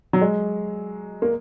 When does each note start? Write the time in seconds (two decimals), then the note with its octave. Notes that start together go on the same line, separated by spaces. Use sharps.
0.13 F#3
0.21 G#3
1.22 A#3